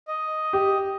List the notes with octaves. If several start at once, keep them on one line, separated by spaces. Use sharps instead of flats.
D#5
G4